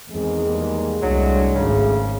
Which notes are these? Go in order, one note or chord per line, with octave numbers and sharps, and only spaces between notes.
E2 D#3 G#3 C4 G#4
D#3 G3 A#3
C2 A2 F#3 D4
G#1 C#3 A3 G#4